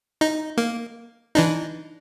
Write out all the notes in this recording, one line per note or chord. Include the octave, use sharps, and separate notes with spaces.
D#4
A#3
E3 D4 D#4